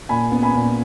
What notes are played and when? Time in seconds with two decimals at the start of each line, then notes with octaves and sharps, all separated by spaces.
0.09 A#2 G#5 B5
0.32 B3
0.43 G#5 B5
0.55 A#2